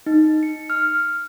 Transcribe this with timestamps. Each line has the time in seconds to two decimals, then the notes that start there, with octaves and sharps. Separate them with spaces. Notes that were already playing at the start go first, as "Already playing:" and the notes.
0.06 D#4
0.43 C#7
0.70 F6